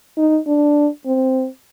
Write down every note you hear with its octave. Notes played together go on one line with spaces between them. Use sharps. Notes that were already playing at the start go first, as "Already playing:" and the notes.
D#4
D4
C4